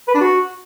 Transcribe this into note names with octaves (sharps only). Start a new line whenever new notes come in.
B4
D4
F#4